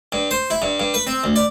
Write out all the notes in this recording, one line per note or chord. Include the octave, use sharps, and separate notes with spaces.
G2
C5
E4
G2
G2
B4
C4
D2
D5